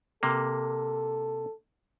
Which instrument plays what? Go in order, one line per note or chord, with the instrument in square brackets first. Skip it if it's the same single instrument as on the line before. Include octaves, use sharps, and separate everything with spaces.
[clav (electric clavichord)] C3 A#3 [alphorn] A4